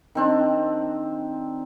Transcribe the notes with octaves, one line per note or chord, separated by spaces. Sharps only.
D#3 C4 D4